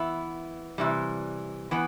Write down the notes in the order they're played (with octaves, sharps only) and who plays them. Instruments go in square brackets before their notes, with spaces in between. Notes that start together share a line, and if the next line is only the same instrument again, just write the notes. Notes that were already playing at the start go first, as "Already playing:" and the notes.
Already playing: [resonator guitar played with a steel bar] E3 B3 E4
C3 E3 G3
E3 B3